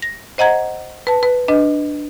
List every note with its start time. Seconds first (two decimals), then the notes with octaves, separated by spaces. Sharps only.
0.02 A#6
0.38 C5 D#5 F#5 A#5 G#6
1.07 B4 A5
1.23 B4
1.48 D4 B4 D#5